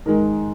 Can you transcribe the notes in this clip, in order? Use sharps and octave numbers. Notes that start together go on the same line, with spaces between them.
G#2 D#3 G#3 A#4